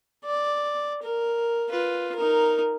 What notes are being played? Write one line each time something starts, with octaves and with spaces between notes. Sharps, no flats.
D5
A#4
F4 B4
D#4 A#4